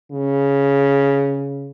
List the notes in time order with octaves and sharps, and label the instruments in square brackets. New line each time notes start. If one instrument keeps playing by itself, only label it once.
[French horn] C#3